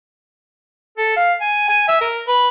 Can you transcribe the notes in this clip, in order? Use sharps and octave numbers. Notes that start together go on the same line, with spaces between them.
A4
F5
G#5
G#5
E5
A#4
B4